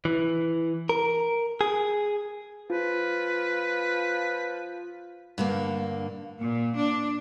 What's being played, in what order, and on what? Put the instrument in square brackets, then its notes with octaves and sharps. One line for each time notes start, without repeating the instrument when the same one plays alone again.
[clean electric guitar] E3
A#4
G#4
[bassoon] F3 [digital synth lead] F4 [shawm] B4
[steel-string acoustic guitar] G2 D3 A#3
[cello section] A#2
D4